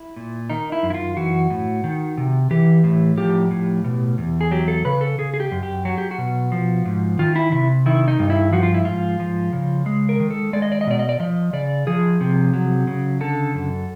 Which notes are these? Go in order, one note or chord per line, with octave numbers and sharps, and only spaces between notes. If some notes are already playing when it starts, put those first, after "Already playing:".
Already playing: E4
A#2
D#3 D#4
E4
F#2
E4
F4
E3 F#4
A2
D#3
C3
E3 G4
A2
F3 G4
A2
B2
E2
G#4
F#3 G4
A4
C#3 B4
A4
C#3 G#4
G#4
G4
F#2
G4
F#3 F#4
G4
F#4
B2
F3
G#2
D#3 F4
E4
C3 E4
D#3 E4
D#4
G2
E4
F3 F#4
F4
E4
G#2 F4
F3
C#3
G#3
A#4
D#3
A4
G#3 D5
D#5
D5
D#5
B2 D5
D#5
D5
F3 D#5
C#3 D5
F3 G#4
C3
F#3
C#3
D3 A4
F#2